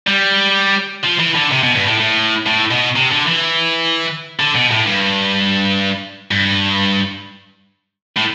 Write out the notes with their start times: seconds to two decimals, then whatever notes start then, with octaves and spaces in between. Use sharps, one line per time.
0.07 G3
1.03 F3
1.19 E3
1.35 D3
1.51 C3
1.63 B2
1.75 G2
1.87 A2
2.00 A2
2.47 A2
2.71 B2
2.96 C3
3.11 D3
3.27 E3
4.40 D3
4.55 B2
4.72 A2
4.87 G2
6.31 G2
8.17 A2